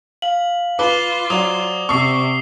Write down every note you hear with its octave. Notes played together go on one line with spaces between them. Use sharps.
F5 F#7
F4 B4 D6 G7
F#3 C5 D5 F#5 D#6
C3 C4 C#6 D#6 E6 C7